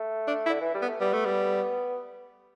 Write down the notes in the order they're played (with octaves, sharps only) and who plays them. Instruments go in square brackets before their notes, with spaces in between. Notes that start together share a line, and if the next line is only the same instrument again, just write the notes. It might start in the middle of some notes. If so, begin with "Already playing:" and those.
Already playing: [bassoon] A3
[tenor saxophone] D4
E4
[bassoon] D3
E3
G3
[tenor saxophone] B3
[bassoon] A3
[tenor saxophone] G3 [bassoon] B3
[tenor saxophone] A3
G3